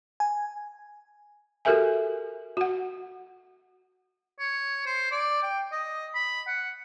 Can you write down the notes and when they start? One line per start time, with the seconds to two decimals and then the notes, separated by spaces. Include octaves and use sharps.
0.20 G#5
1.65 F#4 G4 A4 A#4 E5 G#5
2.57 F#4 F#5
4.39 C#5
4.86 C5
5.11 D5
5.43 G5
5.72 D#5
6.15 B5
6.47 F#5